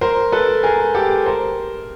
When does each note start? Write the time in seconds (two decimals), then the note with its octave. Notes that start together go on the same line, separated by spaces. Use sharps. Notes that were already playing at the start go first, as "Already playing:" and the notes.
0.01 A#4 C5
0.32 A4 B4
0.63 G#4 A#4
0.95 G4 A4
1.26 A#4 C5